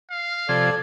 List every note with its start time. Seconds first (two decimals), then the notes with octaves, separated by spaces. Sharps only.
0.11 F5
0.49 C3 F3 A4 D5 G#6